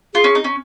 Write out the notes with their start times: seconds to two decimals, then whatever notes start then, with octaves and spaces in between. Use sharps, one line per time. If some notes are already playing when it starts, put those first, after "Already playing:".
0.14 F4 G#4
0.24 C#4
0.35 D#4
0.44 C#4